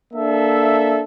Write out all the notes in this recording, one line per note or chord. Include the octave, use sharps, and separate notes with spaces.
A#3 D4 A4 E5